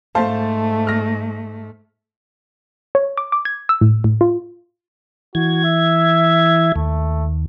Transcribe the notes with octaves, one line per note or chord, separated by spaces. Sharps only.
G#2 A3 C5 F5 A5
F6 A#6
C#5
D6
D6
G#6
E6
A2
A2
F4
E3 F#4 G#6
E5
D#2 A3